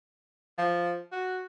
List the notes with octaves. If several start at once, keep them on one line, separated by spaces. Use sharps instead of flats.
F3
F#4